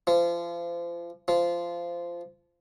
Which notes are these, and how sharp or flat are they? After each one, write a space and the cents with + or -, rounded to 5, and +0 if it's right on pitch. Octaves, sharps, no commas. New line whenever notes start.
F3 -30
F3 -15